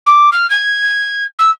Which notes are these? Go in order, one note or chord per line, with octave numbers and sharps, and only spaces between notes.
D6
F6
G#6
E6